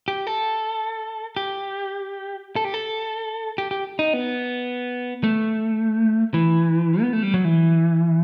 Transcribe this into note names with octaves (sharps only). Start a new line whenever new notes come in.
G4
A4
G4
A4
G4
A4
G4
G4
D#4
B3
A3
E3
B3
A3
G3
F#3
E3